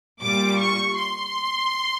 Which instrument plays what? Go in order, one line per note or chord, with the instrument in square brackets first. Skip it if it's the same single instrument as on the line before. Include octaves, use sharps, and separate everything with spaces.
[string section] A#2 G3 D6
C#6
C6